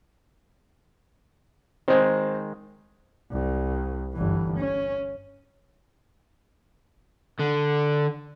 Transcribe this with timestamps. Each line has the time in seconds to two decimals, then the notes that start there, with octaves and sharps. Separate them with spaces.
1.88 D#3 G#3 C4
3.32 C2
4.13 G1 E3
4.57 C#4
7.39 D3